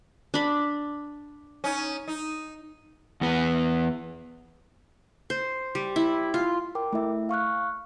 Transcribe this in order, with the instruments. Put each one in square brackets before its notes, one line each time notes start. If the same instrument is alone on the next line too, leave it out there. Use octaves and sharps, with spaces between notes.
[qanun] D4 B5
[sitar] C#4 D#4
D#4
[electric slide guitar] E2 B3
[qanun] C5
G3
E4
F4
[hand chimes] A#4 G5 D6
A3 E4 E5
F5 C#6 F6 F#6